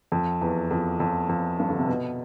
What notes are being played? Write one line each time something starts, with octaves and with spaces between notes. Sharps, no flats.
F2
E2
F2
F2
F2
G2
D3
C3
B2